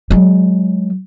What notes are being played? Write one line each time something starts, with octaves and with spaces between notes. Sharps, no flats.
F#3 G#3